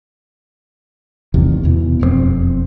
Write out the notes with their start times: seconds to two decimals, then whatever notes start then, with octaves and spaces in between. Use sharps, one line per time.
1.34 A1 E2 C3 D#3
1.64 E2 B2 E3
1.99 E1 F2 G#3 C4